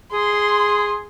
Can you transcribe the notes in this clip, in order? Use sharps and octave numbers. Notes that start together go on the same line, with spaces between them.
G#4 C6